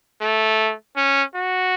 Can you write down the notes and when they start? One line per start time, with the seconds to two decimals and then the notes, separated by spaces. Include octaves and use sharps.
0.21 A3
0.97 C#4
1.35 F#4